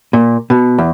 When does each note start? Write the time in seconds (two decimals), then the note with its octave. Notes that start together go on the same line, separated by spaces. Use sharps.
0.13 A#2
0.50 B2
0.78 E2